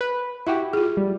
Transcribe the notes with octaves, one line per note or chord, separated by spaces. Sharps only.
B4
E4 F#4 G4 E5
F4 G#4
G3